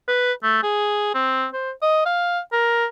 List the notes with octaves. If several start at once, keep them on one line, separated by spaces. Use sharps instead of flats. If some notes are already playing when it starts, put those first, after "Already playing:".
B4
A3
G#4
C4
C5
D#5
F5
A#4